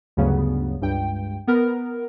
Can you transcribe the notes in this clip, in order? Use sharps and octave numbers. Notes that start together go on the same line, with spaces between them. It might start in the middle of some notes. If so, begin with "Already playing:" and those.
D2 G2 C#3 F#3 B3
C#2 G2 G5
B3 A#4